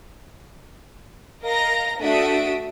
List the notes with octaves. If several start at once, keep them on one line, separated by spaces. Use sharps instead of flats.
A#4 D#5 F5 A#5 A#6
A3 D4 F#4 E5 D#6 D7